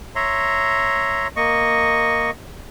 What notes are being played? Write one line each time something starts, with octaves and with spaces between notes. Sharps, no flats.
C#5 E5 A#5 C6
A#3 D#5 C#6